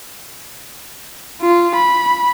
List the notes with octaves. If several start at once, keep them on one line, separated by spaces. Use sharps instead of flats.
F4
B5